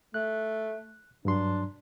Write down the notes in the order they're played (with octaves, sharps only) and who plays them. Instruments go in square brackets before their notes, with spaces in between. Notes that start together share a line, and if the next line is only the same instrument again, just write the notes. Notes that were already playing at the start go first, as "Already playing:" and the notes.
[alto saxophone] A3 [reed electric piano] F#6
[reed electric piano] G2 F#3 C6 [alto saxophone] D4